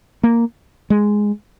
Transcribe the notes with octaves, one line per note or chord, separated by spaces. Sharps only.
A#3
G#3